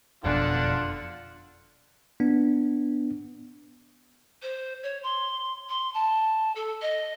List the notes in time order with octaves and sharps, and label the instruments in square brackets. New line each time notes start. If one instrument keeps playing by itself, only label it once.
[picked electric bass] F#1 F2 B2 [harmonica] D3 F4 [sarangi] D4 [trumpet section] A4 F#5
[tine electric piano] B3 D4
[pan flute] C5
C#5
C6
C6
A5
A4
D#5